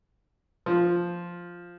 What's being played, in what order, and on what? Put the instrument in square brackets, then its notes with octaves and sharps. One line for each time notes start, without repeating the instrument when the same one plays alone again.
[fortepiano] F3